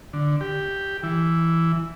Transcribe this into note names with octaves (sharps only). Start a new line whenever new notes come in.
D3
G4
E3